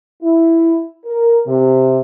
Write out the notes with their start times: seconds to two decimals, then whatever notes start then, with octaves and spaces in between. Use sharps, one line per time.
0.23 E4
1.05 A#4
1.47 C3